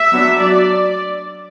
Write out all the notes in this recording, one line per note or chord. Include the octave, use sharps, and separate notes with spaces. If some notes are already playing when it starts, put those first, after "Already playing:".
Already playing: E5
F#3 B3 D4
F#3 D4 D5